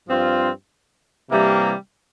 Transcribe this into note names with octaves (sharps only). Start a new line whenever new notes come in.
G2 F3 C4 F4
C3 E3 G3 A#3